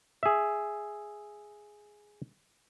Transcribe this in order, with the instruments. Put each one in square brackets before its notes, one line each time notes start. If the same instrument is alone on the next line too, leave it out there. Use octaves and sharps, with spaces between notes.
[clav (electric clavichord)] G#4 E5